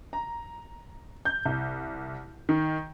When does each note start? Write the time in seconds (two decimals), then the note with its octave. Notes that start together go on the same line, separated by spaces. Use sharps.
0.13 A#5
1.25 G6
1.45 C2
2.49 D#3